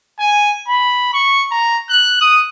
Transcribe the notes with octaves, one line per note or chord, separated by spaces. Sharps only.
G#5
B5
C#6
A#5
F#6
D#6